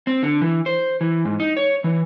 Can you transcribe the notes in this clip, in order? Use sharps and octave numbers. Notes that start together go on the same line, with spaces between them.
C4
D3
E3
C5
E3
G#2
D#4
C#5
E3